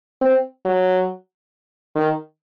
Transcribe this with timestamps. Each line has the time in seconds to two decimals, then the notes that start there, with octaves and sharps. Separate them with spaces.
0.21 C4
0.65 F#3
1.95 D#3